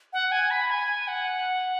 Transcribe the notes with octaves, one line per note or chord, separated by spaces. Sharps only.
F#5
G#5
B5
G#5
F#5